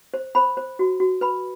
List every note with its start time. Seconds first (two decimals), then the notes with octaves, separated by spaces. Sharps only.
0.14 C5
0.35 C5 B5
0.57 C5
0.79 F#4
1.00 F#4
1.21 B4 B5